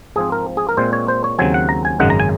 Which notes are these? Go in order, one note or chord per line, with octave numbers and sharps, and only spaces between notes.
G#2 F3 C4 G#4
A#4
G#4
A#4
A#2 G#3 C4 C5
C#5
C5
C#5
D#2 C#3 F#3 C4 G#5
F#5
A#5
G#5
G#1 F#2 C#3 G#3 D#4 F#5
A#5
G#5